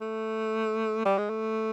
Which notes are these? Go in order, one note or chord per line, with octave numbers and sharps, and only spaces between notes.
A3
G3
G#3
A3